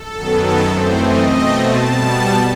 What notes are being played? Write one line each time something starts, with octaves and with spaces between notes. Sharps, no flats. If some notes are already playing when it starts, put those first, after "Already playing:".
Already playing: A4
F#2 D#3 F#3 B3
A4
F#2 E3 A3 C4 C5
D#5
B2 A3 C4
A5
B2 G3 B3